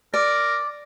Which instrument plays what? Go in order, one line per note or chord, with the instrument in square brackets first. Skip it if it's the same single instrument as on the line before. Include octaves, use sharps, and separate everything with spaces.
[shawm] A#4 [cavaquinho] D5